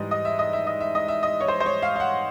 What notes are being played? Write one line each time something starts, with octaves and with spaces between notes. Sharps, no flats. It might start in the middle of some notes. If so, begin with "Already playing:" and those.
Already playing: G#2 E3 G3 D#5
D#5
E5
D#5
E5
D#5
E5
D#5
E5
D#5
C#5
C5
C5
C#5
F5
F5
F#5